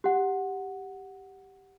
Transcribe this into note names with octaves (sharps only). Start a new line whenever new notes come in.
G4 F#5